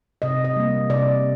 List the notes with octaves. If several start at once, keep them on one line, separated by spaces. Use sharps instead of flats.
C3 D#5
D#5
G3 A#3
C3 D5